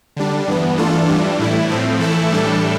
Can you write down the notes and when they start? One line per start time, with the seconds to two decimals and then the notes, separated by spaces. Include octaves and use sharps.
0.17 D3 G3 D4
0.48 G2 E3 B3
0.77 E3 A3 D4 F4 A4
1.08 G2 E3 G3 D4
1.39 A2 E3 A3 E4
1.69 A2 F3 A3 C4
1.99 E3 A3 E4 A4 E5
2.31 A2 E3 G3 D4 A4